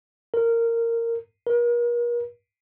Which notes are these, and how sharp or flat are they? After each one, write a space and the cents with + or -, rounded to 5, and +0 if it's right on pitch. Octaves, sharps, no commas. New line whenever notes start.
A#4 -15
A#4 +40